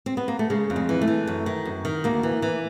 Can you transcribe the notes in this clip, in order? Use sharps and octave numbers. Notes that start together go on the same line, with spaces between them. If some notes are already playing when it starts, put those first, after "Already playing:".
C4
B3
A#3
A3
C#3 G#3
F2
G#3
E3
A3
E3
F#2
D#3
F#2
D#3
D2 A#3
E3
E3